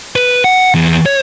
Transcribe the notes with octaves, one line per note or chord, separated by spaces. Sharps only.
B4
F#5
E2
C#5